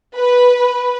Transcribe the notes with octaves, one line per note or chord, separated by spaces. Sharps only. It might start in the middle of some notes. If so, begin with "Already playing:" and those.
B4